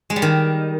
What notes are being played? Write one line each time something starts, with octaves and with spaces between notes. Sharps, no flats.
G#3
G3
D#3